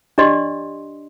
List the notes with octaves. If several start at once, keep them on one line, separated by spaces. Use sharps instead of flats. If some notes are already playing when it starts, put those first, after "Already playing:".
D4 G4 D5 D#5 C6